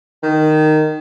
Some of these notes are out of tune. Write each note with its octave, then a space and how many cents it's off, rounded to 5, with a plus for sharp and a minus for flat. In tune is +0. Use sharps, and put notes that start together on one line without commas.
D#3 -10